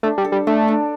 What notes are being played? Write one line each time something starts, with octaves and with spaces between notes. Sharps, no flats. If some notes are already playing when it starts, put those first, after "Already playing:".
A3 D4
G3
A4
G3
A3 D4
D4